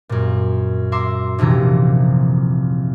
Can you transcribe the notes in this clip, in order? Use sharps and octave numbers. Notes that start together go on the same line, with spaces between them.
F#2 A#2
E5 A#5 C6 D6
F1 A#1 C3 E3 A#5